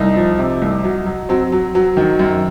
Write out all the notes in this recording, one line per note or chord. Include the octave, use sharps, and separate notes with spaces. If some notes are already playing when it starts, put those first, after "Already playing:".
Already playing: C2 D#4
F3
C3
C2
F#3
F#3
F#3 C4
F#3
F#3
D#3
F#2